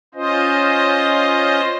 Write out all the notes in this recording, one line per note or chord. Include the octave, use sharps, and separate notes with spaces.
C#4 F4 C5 D#5